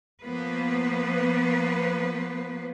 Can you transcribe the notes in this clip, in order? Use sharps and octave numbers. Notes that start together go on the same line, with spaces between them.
F3 A#3 B3 B4 C5